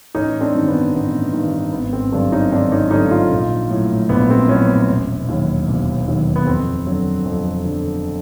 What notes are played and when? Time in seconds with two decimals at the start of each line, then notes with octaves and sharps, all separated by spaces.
0.15 A1 C#4 D#4
0.41 C4 D4
0.54 G2 D#3
0.68 B3 C#4
0.94 A1 B3
1.33 G2 D#3
1.72 G#1 B3
1.93 C4
2.12 G2 D3 F#3 C4 D4
2.32 C#4 D#4
2.51 G#1 C4 D4
2.72 C#4 D#4
2.91 G2 D3 F#3 C#4 D#4
3.11 D#4 F4
3.31 A#1
3.71 A2 F#3
4.09 A#1 B3
4.30 C4
4.49 A2 F#3 B3 C#4
4.89 E1
5.28 D#2 D#3 F#3
5.68 E1
6.08 D#2 D#3 F#3
6.36 B3
6.47 F2 C4
6.87 D3 F#3
7.25 F2
7.65 D3 F#3